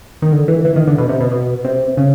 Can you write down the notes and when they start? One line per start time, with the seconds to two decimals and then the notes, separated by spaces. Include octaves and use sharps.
0.22 D#3
0.32 D3
0.48 E3
0.65 E3
0.76 D#3
0.87 D3
0.98 B2
1.09 C3
1.20 B2
1.31 B2
1.64 C3
1.97 C#3